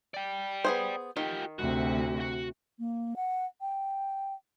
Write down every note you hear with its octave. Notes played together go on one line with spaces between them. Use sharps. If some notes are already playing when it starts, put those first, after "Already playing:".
D5 G5
B3 G#4 C5
D#3 F4 G4
D2 C3 F#4
F#4
A#3
F#5
G5